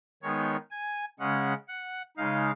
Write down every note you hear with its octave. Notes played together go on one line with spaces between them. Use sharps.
D#3 G#3 B3 D#4 C#5
G#5
C#3 G#3 C#4 F#5
F#5
C#3 G#3 D#4 F5